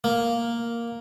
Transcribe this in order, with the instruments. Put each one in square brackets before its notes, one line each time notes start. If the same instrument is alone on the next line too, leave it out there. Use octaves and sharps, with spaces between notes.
[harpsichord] A#3